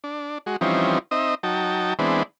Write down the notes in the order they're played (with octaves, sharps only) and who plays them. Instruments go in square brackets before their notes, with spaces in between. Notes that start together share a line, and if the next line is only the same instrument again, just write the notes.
[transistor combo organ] D4
G#3 F#4
E3 F3 G3 C4 C#4 D#4
C4 D#4 D#5 E5
F#3 D#4 G5 A5
E3 G#3 B3 C4 D4